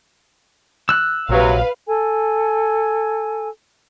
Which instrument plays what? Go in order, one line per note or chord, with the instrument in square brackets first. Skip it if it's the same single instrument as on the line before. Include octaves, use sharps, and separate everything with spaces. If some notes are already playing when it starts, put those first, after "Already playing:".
[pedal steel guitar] E6 F#6
[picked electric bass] A#1 [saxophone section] C3 F#3 [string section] B4 F5
[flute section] A4 G#5